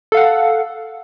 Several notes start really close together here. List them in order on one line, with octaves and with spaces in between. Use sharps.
A4 F5 F#5